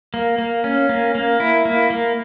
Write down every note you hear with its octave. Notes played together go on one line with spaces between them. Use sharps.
A#3
A#3
C#4
A#3
A#3
E4
A#3
A#3